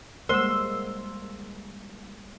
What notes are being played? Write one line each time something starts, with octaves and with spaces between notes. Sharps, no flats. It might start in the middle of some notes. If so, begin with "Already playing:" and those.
G3 G#3 A#3 A#4 C5 F#5 C6 E6